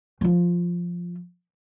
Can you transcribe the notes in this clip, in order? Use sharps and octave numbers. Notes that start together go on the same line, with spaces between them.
F3 F4